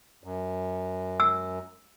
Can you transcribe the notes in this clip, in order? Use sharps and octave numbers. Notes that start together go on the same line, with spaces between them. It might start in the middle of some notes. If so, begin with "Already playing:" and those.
F#2
E6